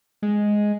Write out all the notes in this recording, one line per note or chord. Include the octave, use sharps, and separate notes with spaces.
G#3